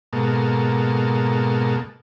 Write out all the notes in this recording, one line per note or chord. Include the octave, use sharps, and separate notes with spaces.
G#2 B2 A#3 A4